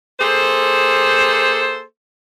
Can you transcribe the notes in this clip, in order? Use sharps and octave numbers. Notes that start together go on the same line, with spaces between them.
A#3 G#4 A4 C5